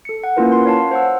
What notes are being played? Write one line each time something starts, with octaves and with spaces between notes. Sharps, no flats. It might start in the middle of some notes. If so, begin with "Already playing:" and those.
A4 C#7
F#5
A#3 C#4 E4 F4 A#4 B4
C6
C#5 F5 A5
C5 F#5 E6